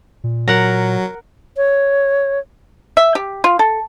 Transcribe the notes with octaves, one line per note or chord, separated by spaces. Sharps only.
A#2
F#3 A#4 F#5
C#5
E5
G4
F4
A4